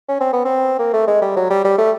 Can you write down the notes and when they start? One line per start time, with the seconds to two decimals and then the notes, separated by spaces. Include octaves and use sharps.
0.09 C#4
0.21 C4
0.33 B3
0.45 C4
0.79 A#3
0.94 A3
1.08 G#3
1.22 G3
1.37 F#3
1.50 G3
1.65 G3
1.78 A3